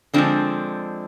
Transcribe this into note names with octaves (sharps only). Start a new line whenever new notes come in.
D3 F3 G#3 C4 D4